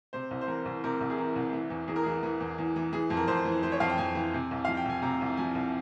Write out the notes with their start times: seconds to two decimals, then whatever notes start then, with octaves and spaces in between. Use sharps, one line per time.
0.13 C3 C5
0.31 C2
0.41 C5
0.48 E3 A#4
0.65 C2
0.84 C3 A#4
1.01 C2
1.10 G#4
1.18 E3 A#4
1.36 C2
1.53 E3
1.70 E2
1.88 E2 G#4
1.96 A#4
2.04 E3 G#4
2.23 E3
2.41 E2
2.58 E2
2.76 E3
2.93 E3 G#4
3.10 F2
3.17 A#4
3.28 F2 C5
3.45 E3
3.63 E3 C5
3.72 C#5
3.80 F2 F5
3.89 G5
3.98 F2 G#5
4.15 E3
4.34 C3
4.51 C2
4.65 F3 F5
4.77 G5
4.86 C2 G#5
5.02 C3 A#5
5.21 C2
5.37 F3 G#5
5.55 C2